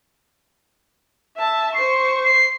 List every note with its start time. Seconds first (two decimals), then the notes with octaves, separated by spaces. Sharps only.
1.37 E5 A5
1.75 C5 C#6 C7
2.24 C7